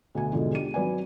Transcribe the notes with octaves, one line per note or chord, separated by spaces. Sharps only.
D2 B2 F#4 G#5
E2 G#2 B2 D3 F3
D4 G4 D#7
G#1 F#3 B4 D5 G#5